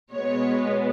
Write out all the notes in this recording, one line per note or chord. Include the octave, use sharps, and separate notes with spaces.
B2 G#3 B3 C#5